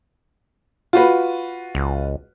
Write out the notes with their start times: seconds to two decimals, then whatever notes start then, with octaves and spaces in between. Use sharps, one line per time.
0.93 F4 F#4 B4
1.75 C#2